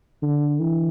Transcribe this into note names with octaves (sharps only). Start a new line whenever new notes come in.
D3
E3